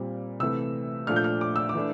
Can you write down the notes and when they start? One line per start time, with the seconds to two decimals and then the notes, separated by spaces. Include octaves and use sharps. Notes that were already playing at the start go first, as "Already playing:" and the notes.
Already playing: A#2 G3 C4
0.40 C3 E3 A3 E6
1.07 A#2 F3 A3 D4 F6
1.16 G6
1.24 F6
1.41 D6
1.56 E6
1.69 D6
1.75 E3 A3 D4